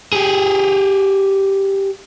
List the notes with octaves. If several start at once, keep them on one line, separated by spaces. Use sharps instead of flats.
G4 G#4